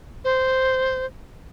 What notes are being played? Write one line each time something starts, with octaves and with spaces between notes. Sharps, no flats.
C5